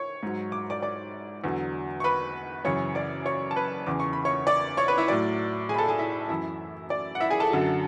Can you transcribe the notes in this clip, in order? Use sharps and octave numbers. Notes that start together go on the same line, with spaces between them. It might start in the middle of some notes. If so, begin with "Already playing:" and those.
Already playing: C#5 C#6
G#2 F#3
D6
D5 D6
D5 D6
E2 D3 F#3
C#6
B4 B5
F#2 C#3 E3 C#5 C#6
D5 D6
C#5 C#6
A5
B4 B5
E2 C#3 E3 D6
C#6
B5
C#5 C#6
D5 D6
C#5 C#6
B4 B5
E4 E5
A2 F#3 D5
G#4 G#5
B5
A4 A5
G#4 G#5
E4 E5
F#2 E3 E4 E5
D5
F#5
E4 E5
G#4 G#5
A4 A5
F#2 D3 F#3